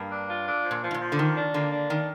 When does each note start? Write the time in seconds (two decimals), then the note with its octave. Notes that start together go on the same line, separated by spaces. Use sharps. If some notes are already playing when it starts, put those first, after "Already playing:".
Already playing: G2 A#3
0.11 D4
0.29 F4
0.47 D4
0.65 F3
0.71 A#2
0.83 F3
0.91 G#2
0.94 A#2
1.01 F3
1.12 D3
1.19 D#3 A#3
1.37 D4
1.54 D3 A#3
1.72 D4
1.90 D#3 A#3